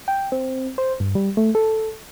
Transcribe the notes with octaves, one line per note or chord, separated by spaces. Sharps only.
G5
C4
C5
G2
G3
A3
A4